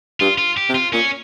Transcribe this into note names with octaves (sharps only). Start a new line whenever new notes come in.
G2 F4
F4
G4
C3
F4
A#2 C#4